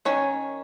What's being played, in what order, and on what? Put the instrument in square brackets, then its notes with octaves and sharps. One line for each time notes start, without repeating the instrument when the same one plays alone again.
[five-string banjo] D#3 C#4 C#5